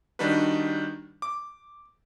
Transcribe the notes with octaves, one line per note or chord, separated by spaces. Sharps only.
D#3 G3 D4 D#4 F#4 B4
D6